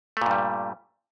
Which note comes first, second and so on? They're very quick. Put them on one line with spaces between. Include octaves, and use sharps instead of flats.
A3 A#2 G2 G3